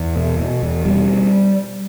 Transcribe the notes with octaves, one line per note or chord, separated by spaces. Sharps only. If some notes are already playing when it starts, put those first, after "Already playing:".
Already playing: E2
B2
B2
E2
B2 G3